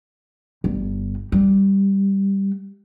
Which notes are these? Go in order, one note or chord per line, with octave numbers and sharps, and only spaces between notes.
G1
G3